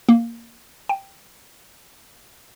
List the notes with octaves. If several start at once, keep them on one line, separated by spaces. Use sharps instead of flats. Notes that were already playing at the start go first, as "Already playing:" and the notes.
A#3
G5